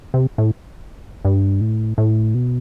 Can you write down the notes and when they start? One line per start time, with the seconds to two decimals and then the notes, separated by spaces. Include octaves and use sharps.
0.14 C3
0.38 A2
1.25 G2
1.61 A2
1.98 A2
2.34 B2